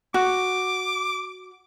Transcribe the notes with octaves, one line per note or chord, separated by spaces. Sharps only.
F#4 D6